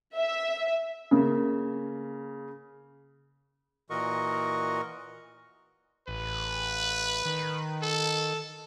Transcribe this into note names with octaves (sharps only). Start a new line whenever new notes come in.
E5
C#3 A#3
A#2 E3 F#4 A#4 D#5 C#6
A1 B4
D#3
A4